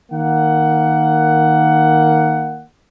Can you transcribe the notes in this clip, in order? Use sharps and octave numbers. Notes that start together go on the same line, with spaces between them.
D#3 A#3 F#5